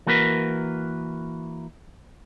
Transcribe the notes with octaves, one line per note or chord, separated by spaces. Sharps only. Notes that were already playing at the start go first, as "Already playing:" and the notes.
E3 A#3 F#4 A#4 B4